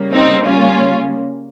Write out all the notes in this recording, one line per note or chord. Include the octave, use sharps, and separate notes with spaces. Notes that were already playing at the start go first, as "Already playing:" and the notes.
Already playing: C#3 G3 A#3
C4 D#4
C#4 F4